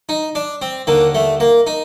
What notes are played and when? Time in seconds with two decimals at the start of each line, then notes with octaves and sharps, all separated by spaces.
0.09 D#4
0.35 D4
0.62 C4
0.87 D#2 D3 A#3
1.15 A3
1.40 A#3
1.67 D#4